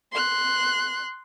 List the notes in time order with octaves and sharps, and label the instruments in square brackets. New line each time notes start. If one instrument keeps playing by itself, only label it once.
[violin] C6 F#6